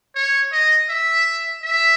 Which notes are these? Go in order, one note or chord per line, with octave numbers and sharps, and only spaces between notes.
C#5
D#5
E5
E5